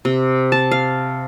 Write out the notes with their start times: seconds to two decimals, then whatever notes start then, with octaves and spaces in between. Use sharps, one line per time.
0.05 C3
0.52 A5
0.71 F5